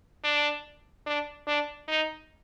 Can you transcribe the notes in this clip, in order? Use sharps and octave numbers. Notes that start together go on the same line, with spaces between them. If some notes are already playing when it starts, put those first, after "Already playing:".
D4
D4
D4
D#4